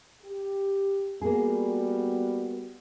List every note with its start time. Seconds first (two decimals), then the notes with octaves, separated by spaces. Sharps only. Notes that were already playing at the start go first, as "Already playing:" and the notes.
0.23 G4
1.22 G3 A#3 B3 F#4 G#4